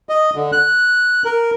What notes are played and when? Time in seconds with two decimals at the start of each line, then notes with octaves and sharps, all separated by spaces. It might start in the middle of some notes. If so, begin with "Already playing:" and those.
0.09 D#5
0.35 D3
0.52 F#6
1.25 A#4